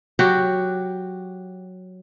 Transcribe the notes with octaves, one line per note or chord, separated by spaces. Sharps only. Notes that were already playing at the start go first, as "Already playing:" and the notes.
F#3 F#4 G4